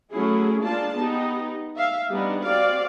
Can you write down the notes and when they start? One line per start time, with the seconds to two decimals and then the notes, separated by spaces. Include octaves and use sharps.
0.12 F#3 A3 C#4 E4 G#4
0.61 G#3 A#3 D4 F4 A5
0.96 B3 D#4 G4
1.76 E5 F5
2.11 G3 B3 D4 D#4
2.42 C4 F#4 D5 F5